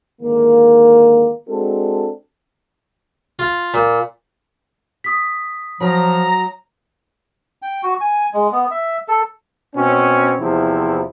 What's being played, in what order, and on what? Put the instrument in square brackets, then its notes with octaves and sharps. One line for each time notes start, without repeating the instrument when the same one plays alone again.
[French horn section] G#2 D3 D#3 A#3
G#3 C4 D4 F#4 A4
[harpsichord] F4
A#2
[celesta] D#6 B6
[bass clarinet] F3 [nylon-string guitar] F#3 [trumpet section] A#5
[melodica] G5
F#4
G#5
G#3
B3
E5
A4
[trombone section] B2 C4 C#4
E2 C3 F3 E4